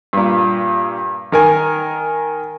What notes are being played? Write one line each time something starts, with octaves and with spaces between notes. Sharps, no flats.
G2 A#2
D#3 A#4 G#5